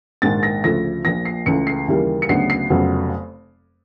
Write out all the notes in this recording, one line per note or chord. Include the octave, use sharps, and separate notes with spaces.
A#1 G#2 D#3 A6
A#6
D2 C#3 F3 A3 A#6
A#1 A#2 F3 A#6
C7
C#2 C#3 E3 A3 C#7
C7
D#2 C#3 E3 G3 A#3
C#7
D2 C#3 F#3 B3 D4 C7
C7
F1 F2 C#3 F#3 B3